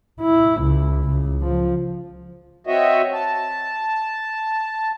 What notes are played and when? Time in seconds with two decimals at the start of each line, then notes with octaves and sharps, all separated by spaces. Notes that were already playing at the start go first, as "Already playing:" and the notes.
0.21 E4
0.62 C#2
1.09 C#2
1.42 F3
2.67 C4 F#4 C#5 D#5 E5
3.13 A5